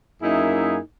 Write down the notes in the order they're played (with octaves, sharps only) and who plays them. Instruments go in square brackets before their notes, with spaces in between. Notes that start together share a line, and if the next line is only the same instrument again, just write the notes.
[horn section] F#2 A#3 D#4 E4 G#4 E5